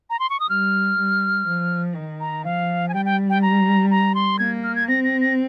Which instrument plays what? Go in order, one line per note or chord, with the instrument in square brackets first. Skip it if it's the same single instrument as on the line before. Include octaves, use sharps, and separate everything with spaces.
[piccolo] A#5
C6
C#6
D#6
[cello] G3 [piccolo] F6
[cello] G3
F3
D#3
[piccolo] A#5
[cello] F3 [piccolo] F5
[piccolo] G#5
[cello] G3 [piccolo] G5
[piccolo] G5
G5
A#5
A#5
C6
[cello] A#3 [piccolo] G#6
[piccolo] F6
G#6
[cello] C4 [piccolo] A#6
[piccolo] A#6
A#6